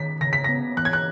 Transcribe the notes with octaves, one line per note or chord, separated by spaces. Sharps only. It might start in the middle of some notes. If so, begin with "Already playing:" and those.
Already playing: D#3 B6
C#3 A#6
B6
B3 A#6
E3 F#6
G#6
F#6